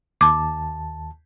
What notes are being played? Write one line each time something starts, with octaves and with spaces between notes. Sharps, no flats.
D#2 A5 D6